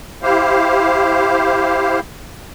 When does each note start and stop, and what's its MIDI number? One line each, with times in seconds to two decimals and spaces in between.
0.23 2.00 64
0.23 2.00 67
0.23 2.00 72
0.23 2.00 77